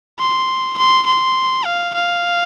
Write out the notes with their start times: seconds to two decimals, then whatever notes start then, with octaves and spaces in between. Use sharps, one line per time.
0.19 C6
0.78 C6
1.06 C6
1.65 F5
1.94 F5